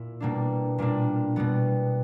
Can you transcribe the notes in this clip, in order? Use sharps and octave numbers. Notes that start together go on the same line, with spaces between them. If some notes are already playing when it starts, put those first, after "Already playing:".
Already playing: A#2 E4
B2 G3 A#3 D4
A#2 G3 A#3 D4
B2 G3 B3